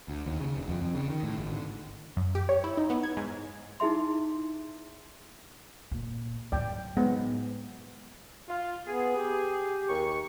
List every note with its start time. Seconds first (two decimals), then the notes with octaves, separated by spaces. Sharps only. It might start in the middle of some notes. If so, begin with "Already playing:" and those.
0.08 D2
0.26 D#2
0.41 C#3
0.56 E1
0.69 F2
0.81 F2
0.94 C#3
1.10 D#3
1.23 A2
1.39 G#1
1.52 D3
2.17 F#2
2.35 G4
2.49 C#5
2.64 E4
2.77 D#4
2.90 B3
3.03 G#6
3.17 G#2
3.80 D#4 E4 G#4 E5 C6
5.91 A#2
6.52 A2 F#3 D5 G5
6.97 G#3 B3 F#5
8.48 F4
8.87 B3 G#4
9.17 G4
9.89 D#2 C#6